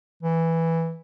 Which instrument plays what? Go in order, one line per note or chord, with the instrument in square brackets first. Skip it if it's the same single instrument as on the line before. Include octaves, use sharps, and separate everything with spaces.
[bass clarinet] E3